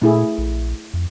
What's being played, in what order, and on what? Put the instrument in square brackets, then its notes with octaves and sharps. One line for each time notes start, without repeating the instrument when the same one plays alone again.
[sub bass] A#2 [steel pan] A3 E4 G#4
[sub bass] A#1
F2